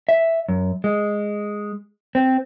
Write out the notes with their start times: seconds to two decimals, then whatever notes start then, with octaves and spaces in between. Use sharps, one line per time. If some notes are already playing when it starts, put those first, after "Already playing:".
0.09 E5
0.49 F#2
0.84 G#3
2.15 C4